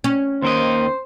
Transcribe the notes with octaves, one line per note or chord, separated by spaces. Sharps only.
C#4
D#2 A#3 C5 D#5